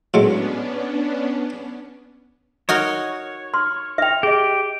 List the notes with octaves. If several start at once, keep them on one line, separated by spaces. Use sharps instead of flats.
A2 F#3 G#3 B3 C#4 D4
D#4 F#4 A#4 C#5
C6 F6
E5 G5 F6 F7
G4 G#4 D#5